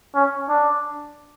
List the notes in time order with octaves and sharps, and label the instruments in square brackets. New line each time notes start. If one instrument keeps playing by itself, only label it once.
[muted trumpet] C#4
D4